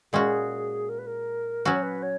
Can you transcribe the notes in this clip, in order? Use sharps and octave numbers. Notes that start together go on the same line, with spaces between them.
A#2 G#3 C#4 F#4 G#4
A#4
B4
A#4
F#3 C#4 F#4 B4
C#5
B4
C#5